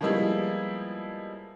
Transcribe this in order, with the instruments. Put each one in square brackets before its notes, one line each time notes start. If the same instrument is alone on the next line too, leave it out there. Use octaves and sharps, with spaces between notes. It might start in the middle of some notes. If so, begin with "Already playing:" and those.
[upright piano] F3 G3 G#3 A#3 B3 E4